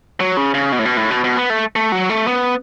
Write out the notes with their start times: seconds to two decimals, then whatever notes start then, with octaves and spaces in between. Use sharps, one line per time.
0.20 F#3
0.37 C#3
0.54 C#3
0.72 B2
0.79 A2
0.85 B2
0.97 A2
1.10 B2
1.24 B2
1.37 B3
1.50 A3
1.76 A3
1.92 F#3
2.09 A3
2.27 B3